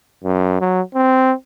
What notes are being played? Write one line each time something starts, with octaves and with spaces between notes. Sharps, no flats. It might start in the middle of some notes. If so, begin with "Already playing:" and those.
F#2
F#3
C4